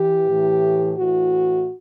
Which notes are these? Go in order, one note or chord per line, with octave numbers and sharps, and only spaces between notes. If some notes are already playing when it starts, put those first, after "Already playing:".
Already playing: E3 G4
A2 E3
A2 E3 F#4